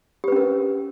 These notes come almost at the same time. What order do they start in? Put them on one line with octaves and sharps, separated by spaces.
G4 B4 C#4 A#4